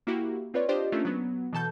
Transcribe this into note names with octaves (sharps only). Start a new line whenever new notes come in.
A#3 E4 F#4 G4
C4 F4 B4 C#5 D5
D4 F4 G4 C5 D5 D#5
A3 A#3 C#4 D4 F4
F#3 B3
B2 E3 A4 A5 G6